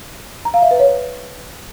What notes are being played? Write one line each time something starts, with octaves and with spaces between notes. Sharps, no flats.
A#5
F5
E5
B4
C#5